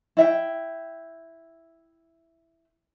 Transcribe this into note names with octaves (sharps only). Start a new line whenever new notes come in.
E4 E5 G5